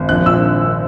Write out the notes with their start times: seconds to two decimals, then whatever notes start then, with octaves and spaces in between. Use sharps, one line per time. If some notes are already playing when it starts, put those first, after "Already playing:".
Already playing: G#1
0.09 A#1 F#6
0.26 A#2 E6